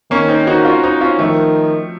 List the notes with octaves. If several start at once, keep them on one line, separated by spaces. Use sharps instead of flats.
D#3 A#3 C#4
C4 D#4
D#4 F#4
C#4 F4
C4 D#4
C#4 F4
D#3 F3 A3